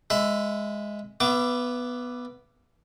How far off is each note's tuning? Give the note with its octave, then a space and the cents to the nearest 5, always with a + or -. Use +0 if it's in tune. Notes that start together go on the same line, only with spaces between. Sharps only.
G#3 +0 E5 +5 B5 +30
B3 +0 E5 +45 D6 -5